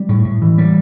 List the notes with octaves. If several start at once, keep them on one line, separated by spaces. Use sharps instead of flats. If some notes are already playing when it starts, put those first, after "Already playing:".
Already playing: G3
A2
A2
E3
G3